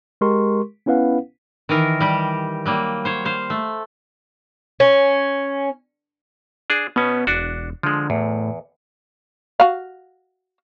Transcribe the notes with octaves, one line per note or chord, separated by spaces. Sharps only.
G#3 G4 A#4 C6 C#6
B3 C#4 E4 B4 F5 F#5
D#3 E3 A#4
G3 G4
F#3 G3 A#3
C5 C#5
C5 F5
A3
C#4
D4 G#4
B2 B3 C#4
E1 D4 F#4
D3 F3 G#3
E2 A2
F#4 F5